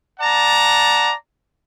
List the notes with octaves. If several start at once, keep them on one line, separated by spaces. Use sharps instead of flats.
D5 F#5 A5 A#5